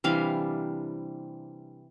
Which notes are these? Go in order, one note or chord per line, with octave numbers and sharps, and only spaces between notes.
C3 E3 G3 D4 F5